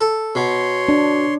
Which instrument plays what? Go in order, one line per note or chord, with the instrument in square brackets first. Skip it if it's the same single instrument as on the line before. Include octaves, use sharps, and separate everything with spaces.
[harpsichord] A4
[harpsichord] B2 [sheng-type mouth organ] C#5 C6
[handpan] D4